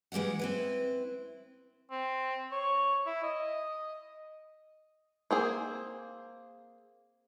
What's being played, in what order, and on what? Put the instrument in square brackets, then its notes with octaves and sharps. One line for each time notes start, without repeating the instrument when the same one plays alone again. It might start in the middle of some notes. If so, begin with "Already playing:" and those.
[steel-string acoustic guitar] E3 G#3 G4 F5 F#5
C4 E4 B4
[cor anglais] C4
C#5
E4
D#5
[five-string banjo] A#3 C4 G#4